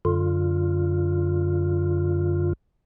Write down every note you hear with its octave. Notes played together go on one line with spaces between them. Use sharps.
F#2 D3 F4